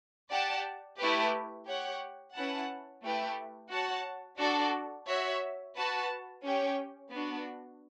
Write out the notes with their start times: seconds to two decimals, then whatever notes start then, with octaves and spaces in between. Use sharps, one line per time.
0.30 G4 D5 F#5 A5
0.98 A3 E4 G4 B4
1.66 G4 C#5 F#5
2.35 C#4 E4 B4 F#5 A5
3.02 A3 E4 G4 B4
3.70 F#4 C#5 F#5 A5
4.39 D4 F#4 A4 D5
5.07 F#4 C#5 E5
5.76 F#4 B4 F#5 A5
6.44 C#4 G4 C#5 G5
7.12 B3 D4 F#4